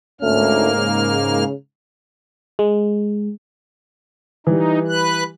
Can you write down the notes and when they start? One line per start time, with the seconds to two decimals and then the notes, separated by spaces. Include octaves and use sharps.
0.21 D2 G#2 A3 A#3 C#4 F6
0.75 C#3
2.59 G#3
4.47 E3 G3 D#4
4.88 B4 F#6